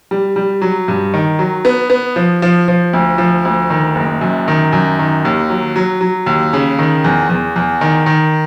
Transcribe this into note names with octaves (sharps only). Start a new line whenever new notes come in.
G3
G3
F#3
G2
D#3
F#3
B3
B3
F3
F3
F3
D2
F3
D2
D#3
F#1
F#2
D#3
F#2
D#3
D#2
F#3
F#3
F#3
D#2
C#3
D#3
E2
E2
E2
D#3
D#3